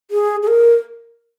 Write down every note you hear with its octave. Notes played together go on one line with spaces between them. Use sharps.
G#4
G#4
A#4